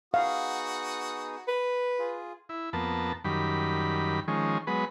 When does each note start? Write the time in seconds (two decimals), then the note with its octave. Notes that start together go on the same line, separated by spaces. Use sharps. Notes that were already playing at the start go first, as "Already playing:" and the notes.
0.14 B3 D#4 F#4 G#4 F5 D#6
1.48 B4
1.99 F4 G#4
2.49 E4
2.73 F2 A#3 B3 A5
3.25 F#2 D#3 G3 B5
4.28 D#3 F3 G#3 C#4
4.67 F#3 G#3 B3 B4